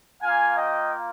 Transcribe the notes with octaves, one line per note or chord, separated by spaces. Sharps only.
A#3 F4 F5 G#5
D#5 G5